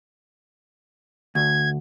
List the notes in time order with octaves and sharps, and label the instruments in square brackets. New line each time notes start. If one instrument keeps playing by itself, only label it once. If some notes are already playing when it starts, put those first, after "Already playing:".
[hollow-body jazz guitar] D2 [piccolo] G#6